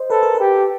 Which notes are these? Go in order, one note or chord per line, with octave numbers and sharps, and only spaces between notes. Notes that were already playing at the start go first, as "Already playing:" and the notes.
Already playing: C5 D#5
A4 B4
A#4
B4
G4